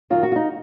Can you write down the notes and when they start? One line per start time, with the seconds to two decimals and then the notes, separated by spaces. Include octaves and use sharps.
0.10 F#2 D#3 F#3 F4
0.23 F#4
0.32 F4
0.36 D#4